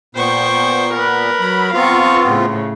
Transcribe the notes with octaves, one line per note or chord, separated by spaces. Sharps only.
A#2 B3 C5 G5 C#6
A#4 B4
F#3 B5
B3 C4 F4 F5 A#5 C#6
A2 C#3